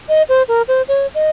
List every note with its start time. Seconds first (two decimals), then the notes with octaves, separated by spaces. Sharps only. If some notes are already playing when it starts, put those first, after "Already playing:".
0.09 D#5
0.29 C5
0.48 A#4
0.68 C5
0.88 C#5
1.15 D#5